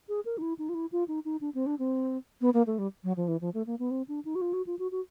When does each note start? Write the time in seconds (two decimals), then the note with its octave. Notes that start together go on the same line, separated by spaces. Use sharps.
0.09 G#4
0.25 A#4
0.38 D#4
0.42 E4
0.59 D#4
0.69 F4
0.74 E4
0.92 F4
1.08 D#4
1.25 D#4
1.41 D4
1.55 C4
1.66 D4
1.79 C4
2.41 B3
2.54 A#3
2.67 A3
2.78 G3
3.04 F#3
3.17 F3
3.28 E3
3.41 F3
3.54 A3
3.67 A#3
3.79 B3
3.91 C4
4.08 D4
4.25 D#4
4.35 F#4
4.41 F4
4.53 F#4
4.67 F4
4.79 F#4
4.91 F#4